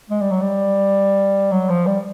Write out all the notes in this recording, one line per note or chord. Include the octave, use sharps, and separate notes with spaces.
G#3
G3
F#3
G3
F#3
F3
G3